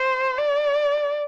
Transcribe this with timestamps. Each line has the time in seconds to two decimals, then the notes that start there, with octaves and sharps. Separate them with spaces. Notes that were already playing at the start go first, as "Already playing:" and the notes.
Already playing: C5
0.37 D5